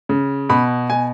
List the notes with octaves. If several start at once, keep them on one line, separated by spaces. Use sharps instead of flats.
C#3
B2 B5
B2 G#5